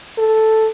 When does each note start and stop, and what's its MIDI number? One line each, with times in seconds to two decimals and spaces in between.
0.18 0.69 69